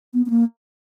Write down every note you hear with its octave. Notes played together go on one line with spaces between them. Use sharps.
B3
B3
A#3